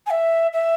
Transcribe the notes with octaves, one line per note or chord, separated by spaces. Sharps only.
G#5
E5
E5